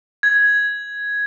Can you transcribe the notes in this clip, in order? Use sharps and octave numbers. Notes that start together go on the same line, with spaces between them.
G#6